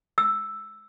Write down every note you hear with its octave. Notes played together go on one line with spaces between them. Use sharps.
E6